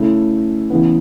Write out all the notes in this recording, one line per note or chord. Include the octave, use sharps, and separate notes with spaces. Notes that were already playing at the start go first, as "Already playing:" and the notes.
Already playing: C#3 A3 E4
C#3 E3 B3